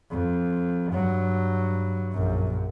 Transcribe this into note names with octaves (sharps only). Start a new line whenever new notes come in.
F2
G2 F#3
A#1 F#2